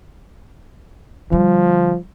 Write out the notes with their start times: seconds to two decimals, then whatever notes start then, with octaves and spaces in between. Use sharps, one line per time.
1.31 D3 F3 G3